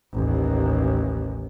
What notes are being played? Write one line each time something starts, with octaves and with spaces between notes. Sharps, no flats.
A1 D#2